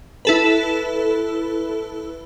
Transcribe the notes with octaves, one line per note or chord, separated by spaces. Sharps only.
E4 A4 B4